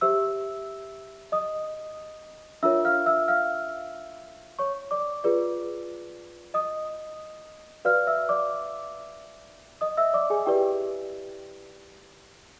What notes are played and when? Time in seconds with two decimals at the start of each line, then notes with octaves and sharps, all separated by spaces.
0.01 G4 C5 E5 E6
1.32 D#5 D#6
2.63 D4 F4 A#4 C#5 E5 E6
2.85 F5 F6
3.06 E5 E6
3.28 F5 F6
4.59 C#5 C#6
4.91 D5 D6
5.24 F4 G#4 B4 D5
6.54 D#5 D#6
7.85 F#4 B4 D5 F5 F6
8.07 E5 E6
8.29 D5 D6
9.81 D#5 D#6
9.97 E5 E6
10.14 D5 D6
10.30 G#4 G#5
10.46 E4 G4 B4 D5 G5